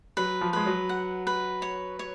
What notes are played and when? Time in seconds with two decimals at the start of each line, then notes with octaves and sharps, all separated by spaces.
0.17 F#3 B4
0.41 F3
0.53 G#3 B4
0.66 F#3
0.89 F#5
1.27 B4
1.62 C#5
1.99 C#5